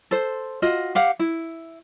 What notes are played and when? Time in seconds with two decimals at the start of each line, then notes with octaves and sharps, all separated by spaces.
0.11 A4 C5
0.62 F4 F#4 D#5
0.95 G4 F5 F#5
1.19 E4